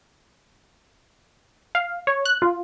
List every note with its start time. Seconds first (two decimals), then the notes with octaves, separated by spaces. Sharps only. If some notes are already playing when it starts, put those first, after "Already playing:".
1.75 F5
2.07 C#5
2.25 F#6
2.42 F4